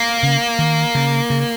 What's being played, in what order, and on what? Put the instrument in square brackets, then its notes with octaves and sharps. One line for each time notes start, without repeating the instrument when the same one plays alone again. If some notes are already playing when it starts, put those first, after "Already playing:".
Already playing: [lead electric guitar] A#3
[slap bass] C#3
D#3
C#3
C#3